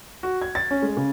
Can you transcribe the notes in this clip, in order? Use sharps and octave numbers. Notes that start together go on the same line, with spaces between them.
F#4
G#6
A6
C#4
G#3
C#3